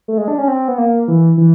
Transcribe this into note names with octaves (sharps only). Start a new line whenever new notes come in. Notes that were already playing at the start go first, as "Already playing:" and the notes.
A3
G#3
D4
C#4
C4
B3
A#3
E3
E3